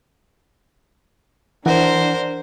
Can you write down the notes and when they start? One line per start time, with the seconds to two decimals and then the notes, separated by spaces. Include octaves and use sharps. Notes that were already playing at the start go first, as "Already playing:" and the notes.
1.66 E3 D4 A#4 C5 F#5